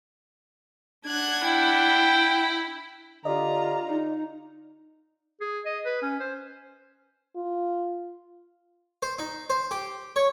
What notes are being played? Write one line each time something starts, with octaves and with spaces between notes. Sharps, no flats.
D4 F#5 F#6 G#6
E4 G5
D3 F4 G4 D5 D#5 A#5
D#4
G#4
D#5
B4
C#4
C5
F4
C5
D#4
C5
G4
C#5